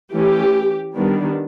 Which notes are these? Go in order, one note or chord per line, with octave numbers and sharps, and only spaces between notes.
E3 A3 C#4 G4
D#3 G3 B3 D4